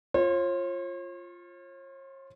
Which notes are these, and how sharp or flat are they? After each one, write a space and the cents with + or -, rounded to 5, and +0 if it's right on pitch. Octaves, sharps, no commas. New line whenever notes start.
F4 +0 C#5 -45